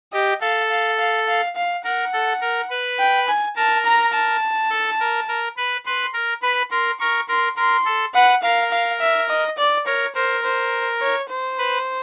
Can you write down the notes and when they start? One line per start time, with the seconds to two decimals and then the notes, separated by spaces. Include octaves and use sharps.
0.13 G4 D#5
0.41 A4 F5
0.70 F5
0.98 F5
1.28 F5
1.56 F5
1.84 A#4 F#5
2.13 A4
2.41 A#4
2.70 B4
2.99 G5
3.28 G#5
3.56 A#4 A5
3.85 A#5
4.14 A5
4.70 A4
5.00 A#4
5.28 A#4
5.57 B4
5.85 B4 C6
6.13 A#4
6.42 B4 B5
6.71 A#4 C6
7.00 A#4 C#6
7.28 A#4 C6
7.57 A#4 C6
7.85 A4
8.14 B4 F#5
8.43 A#4 F5
8.72 F5
9.00 E5
9.29 D#5
9.58 D5
9.86 A#4 C#5
10.15 A#4 C5
10.43 C5
11.01 C#5
11.29 C5
11.58 B4